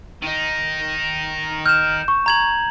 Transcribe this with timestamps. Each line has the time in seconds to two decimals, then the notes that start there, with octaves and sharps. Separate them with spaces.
0.22 D#3 D#4
1.66 F6 G6 E7
2.08 C#6
2.26 A#5 G#6 F#7